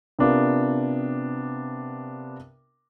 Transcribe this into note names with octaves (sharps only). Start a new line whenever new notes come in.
C3 B3 D4 F4 A#4